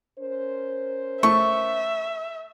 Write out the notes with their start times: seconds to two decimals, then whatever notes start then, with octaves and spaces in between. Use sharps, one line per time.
0.19 C#4 A#4 C5
1.23 A3 E5 C#6